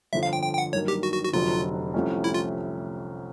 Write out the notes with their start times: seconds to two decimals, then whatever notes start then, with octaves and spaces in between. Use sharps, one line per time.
0.13 G1 F2 D3 F3 E5
0.23 F5
0.33 G5
0.43 G5
0.53 G5
0.58 F#5
0.73 G2 D#3 F#3 A#3 C#5
0.88 G4
1.03 F#4
1.13 F#4
1.24 F#4
1.33 F1 F2 D3 F#3 F4
1.94 C2 C3 F3 A3 C#4
2.24 E4
2.34 F4